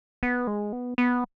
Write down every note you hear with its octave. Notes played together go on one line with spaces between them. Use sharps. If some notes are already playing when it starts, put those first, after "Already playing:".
B3
G#3
B3
B3